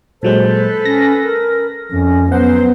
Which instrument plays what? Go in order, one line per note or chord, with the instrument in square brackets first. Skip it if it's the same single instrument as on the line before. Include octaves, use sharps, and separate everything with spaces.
[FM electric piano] A#2 F#3 G#3 [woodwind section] A4 B4 [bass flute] C5
[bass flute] C#4 [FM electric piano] A#6
[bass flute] A#4
[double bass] F2 [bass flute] C#4
[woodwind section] F#3 C5 [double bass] B3 [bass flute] C#4 [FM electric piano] F#5